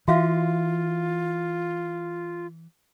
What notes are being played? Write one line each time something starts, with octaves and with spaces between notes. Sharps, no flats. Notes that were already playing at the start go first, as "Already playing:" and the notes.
E3 F4 F#4 E5 F5